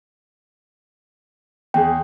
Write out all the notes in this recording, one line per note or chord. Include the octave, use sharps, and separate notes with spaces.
E2 G#4 G5